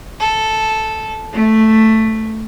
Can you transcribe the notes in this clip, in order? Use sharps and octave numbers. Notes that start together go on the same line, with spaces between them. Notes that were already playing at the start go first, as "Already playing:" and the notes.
A4
A3